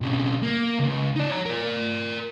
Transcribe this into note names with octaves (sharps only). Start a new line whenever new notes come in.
B1 C#3
A#3
C#2
D#4 D5
C#5 A#5
A#4 D5